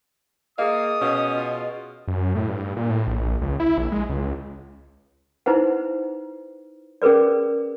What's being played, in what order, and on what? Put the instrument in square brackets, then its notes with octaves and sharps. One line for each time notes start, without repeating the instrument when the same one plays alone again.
[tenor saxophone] A#3 [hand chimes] G#4 D#5 [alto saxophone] F5 [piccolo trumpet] D#6
[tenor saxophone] B2 [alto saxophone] C#4
[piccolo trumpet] F4
[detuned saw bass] F#2
A2
G2
A#2
A2
A#1
A#1
C#2
E4
A#1
G#3
C#2
[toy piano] D#4 E4 B4 C5 F#5
C#4 G#4 A#4 B4 D5